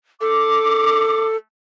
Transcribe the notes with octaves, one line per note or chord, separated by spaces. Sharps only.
A4 D6